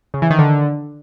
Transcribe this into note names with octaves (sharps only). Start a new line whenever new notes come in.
C#3
E3
D#3
D3